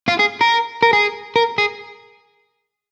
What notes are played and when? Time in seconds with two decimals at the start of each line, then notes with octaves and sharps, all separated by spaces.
0.08 F4
0.19 G#4
0.41 A#4
0.83 A#4
0.93 G#4
1.36 A#4
1.58 G#4